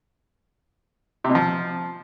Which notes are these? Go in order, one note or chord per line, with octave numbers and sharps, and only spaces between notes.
C3
B2
F3